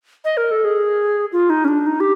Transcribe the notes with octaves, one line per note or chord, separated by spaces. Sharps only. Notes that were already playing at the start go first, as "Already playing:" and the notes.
D#5
A#4
A4
G#4
F4
D#4
C#4
D4
D#4
G4